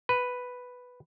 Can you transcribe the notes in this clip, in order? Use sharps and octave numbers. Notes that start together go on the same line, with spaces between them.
B4